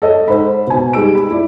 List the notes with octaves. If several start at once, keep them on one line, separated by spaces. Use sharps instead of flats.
A4 C#5 D#5
G#2 C5 B5
B2 G#5
G3 G#3 D#4 E6 D7
B5
E4 D5